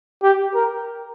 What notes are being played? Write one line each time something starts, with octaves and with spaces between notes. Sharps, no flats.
G4
A#4